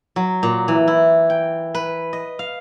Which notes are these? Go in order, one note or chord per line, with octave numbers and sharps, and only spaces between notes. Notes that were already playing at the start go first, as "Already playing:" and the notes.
F#3
A#2
E3
E4
G5
B4
D#5
F5